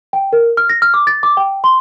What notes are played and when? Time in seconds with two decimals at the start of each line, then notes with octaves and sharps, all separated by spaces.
0.13 G5
0.33 A#4
0.57 F6
0.69 A#6
0.82 F6
0.94 D6
1.07 A6
1.23 D6
1.37 G5
1.64 C6